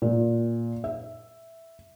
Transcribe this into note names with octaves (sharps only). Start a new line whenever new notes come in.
A#2
E5